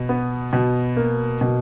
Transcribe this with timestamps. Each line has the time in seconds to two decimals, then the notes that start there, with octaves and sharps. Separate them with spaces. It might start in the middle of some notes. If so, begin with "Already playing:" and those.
Already playing: B2
0.09 B3
0.53 B2
0.97 A#3
1.41 B2